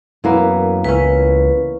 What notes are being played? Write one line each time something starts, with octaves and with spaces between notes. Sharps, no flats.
F#2 E3 A#3 B3
C#2 E3 C#4 B4